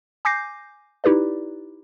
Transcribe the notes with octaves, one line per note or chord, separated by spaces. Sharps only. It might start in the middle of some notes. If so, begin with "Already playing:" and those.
G#5 D6 G6 A#6 C7
D#4 E4 G4 B4 D5